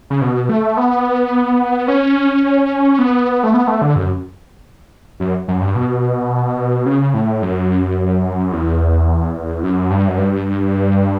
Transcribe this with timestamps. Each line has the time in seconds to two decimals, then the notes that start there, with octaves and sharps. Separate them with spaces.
0.10 C#3
0.21 B2
0.49 A3
0.77 B3
1.88 C#4
2.99 B3
3.44 A3
3.54 B3
3.68 A3
3.82 D3
3.96 F#2
5.20 F#2
5.48 F#2
5.61 G2
5.75 B2
6.86 C#3
7.14 A2
7.42 F#2
8.52 E2
9.63 F#2
9.90 G2
10.08 F#2
10.18 G2